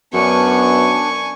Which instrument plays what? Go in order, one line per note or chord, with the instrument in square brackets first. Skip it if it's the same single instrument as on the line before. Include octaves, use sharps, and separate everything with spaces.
[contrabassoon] F#2 [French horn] B3 [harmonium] D4 [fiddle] G#5 C#6